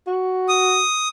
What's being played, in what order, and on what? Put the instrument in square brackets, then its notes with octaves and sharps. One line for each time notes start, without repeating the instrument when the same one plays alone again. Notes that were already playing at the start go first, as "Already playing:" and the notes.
[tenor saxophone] F#4
[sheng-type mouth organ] D#6